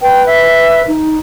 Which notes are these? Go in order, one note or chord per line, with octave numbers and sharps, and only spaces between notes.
B4 G5
E5
D#4